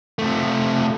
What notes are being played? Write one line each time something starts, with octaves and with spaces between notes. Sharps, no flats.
C3 A3